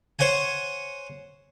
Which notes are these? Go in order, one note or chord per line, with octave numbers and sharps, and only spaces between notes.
C5 C#5 F#5 G#5